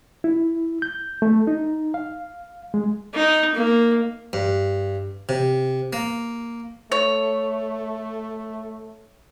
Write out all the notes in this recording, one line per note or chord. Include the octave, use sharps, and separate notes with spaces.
E4
G6
A3
D#4
F5
G#3
D#4
A#3
G2
C3
A#3
A3 C#5